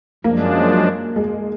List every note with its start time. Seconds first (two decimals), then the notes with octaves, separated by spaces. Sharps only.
0.24 F#2 F3 G#3 A#3 D4
1.16 G#3